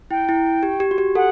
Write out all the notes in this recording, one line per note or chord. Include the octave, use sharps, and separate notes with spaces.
E4 G5
E4
G4
G4
F#4
G4
A4 F#5